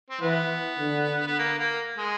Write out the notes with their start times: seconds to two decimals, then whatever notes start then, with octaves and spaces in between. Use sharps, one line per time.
0.10 C4
0.21 E3 B3
0.79 D3
1.27 B3
1.39 A#3
1.58 A#3
1.98 G#3